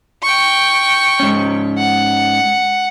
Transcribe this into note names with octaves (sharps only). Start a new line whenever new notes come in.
G5 C#6
G#2 C#4
F#5